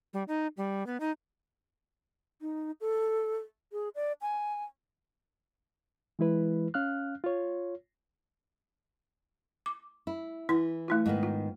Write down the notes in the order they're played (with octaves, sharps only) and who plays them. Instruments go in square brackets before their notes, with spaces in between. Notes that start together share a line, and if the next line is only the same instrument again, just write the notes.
[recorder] G3
D#4
G3
B3
D#4
[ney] D#4
A4
G#4
D5
G#5
[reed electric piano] E3 G#3 E4 B4
C#4 F5 F6 F#6
F4 C#5
[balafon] D6
[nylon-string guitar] E4
[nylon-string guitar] E3 [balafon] E4
[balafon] A3 E4 F4
[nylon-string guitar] G#2 D#3 B3
[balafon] F4